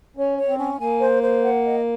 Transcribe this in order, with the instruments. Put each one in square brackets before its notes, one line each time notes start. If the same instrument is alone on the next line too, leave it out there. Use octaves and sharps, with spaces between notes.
[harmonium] C#4 [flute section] C#5
[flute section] C#5
[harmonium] C4
[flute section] C#4
[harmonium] A#3 [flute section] G#5
[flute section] C5
C5
F#5
D#5